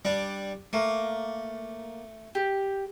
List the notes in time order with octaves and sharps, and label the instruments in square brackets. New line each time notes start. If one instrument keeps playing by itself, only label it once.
[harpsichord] G3 D4
[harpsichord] A3 [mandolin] A#3
[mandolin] G4